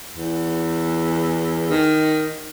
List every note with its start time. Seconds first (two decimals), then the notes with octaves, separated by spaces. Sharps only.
0.15 E2
1.70 D#3